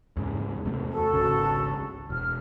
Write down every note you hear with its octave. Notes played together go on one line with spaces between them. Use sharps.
E2 G#2 C#3
E2 C3 A3
F#4 A4
G#1 C#2 C#3
E1 F6